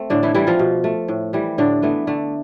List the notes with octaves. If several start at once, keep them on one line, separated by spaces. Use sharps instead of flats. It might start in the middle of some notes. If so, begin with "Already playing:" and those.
Already playing: A3 C4
A2 D3 D4
E3 E4
E3 G3 E4
F3 F4
B2
A3
A2
E3 G3
A2 D3 D4
E3 A3 B3
D3 A3